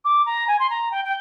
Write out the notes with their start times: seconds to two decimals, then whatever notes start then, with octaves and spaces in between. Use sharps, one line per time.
0.05 D6
0.26 A#5
0.48 G#5
0.59 C6
0.70 A#5
0.92 G5
1.05 G5